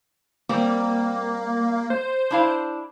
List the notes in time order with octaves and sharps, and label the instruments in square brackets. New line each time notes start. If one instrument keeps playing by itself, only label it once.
[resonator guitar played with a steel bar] G3 C4 [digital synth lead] A#3
[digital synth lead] C5
[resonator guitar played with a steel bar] D4 E4 F5